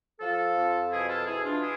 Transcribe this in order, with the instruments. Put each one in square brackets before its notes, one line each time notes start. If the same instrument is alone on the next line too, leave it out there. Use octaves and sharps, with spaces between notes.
[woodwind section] F3 F4 A4
F2
B2 E4 G#4
F4 A4
B2 E4 G#4
D4 F4
E4 G#4